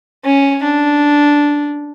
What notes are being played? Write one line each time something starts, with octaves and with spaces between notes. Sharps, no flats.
C#4
D4